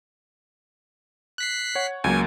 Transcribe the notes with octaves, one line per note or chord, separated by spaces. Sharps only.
F#6 B6 C7
C#5 F#5
C#2 F#3 A#3 G#5